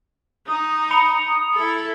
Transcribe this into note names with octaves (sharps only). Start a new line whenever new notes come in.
D#4 D#6
B5 D#6 C#7 F7
E4 A4